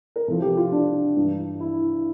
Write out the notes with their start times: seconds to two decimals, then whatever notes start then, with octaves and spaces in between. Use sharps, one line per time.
0.16 A#4
0.27 C2 C3 F3 A4
0.42 G4
0.57 F4
0.72 D4
1.16 G2 E3
1.60 E4